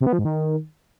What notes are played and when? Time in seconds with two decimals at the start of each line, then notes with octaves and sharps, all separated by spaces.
0.01 C3
0.07 B3
0.13 F3
0.19 G#2
0.25 D#3